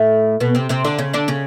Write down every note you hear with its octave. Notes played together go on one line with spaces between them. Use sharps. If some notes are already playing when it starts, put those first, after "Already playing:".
Already playing: A2 A3
B2 B3
C3 C4
C3 C4
D3 D4
C#3 C#4
D3 D4
C#3 C#4